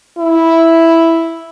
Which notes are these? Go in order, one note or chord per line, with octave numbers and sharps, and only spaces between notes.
E4